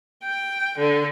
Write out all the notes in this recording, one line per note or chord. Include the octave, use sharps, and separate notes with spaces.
G5
D3